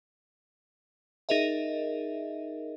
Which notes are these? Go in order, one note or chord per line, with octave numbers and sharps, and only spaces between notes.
D#4 G#4 A#4 D#5 E5